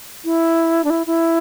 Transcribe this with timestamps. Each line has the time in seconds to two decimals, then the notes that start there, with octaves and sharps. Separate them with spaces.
0.25 E4
0.84 D4
0.90 E4
1.06 E4